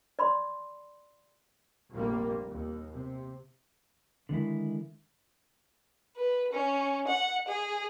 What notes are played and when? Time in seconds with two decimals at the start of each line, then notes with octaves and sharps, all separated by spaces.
0.19 D5 B5 C6
1.90 F1 A#1 A#2 G3 A#3
2.48 D#2
2.92 C3
4.29 D3 D#3 G#3 E4
6.17 B4
6.53 C#4
7.07 F#5
7.48 G#4